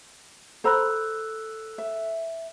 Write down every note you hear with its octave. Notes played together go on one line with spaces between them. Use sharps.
A4 C5 A#5 B5 E6 F#6
E5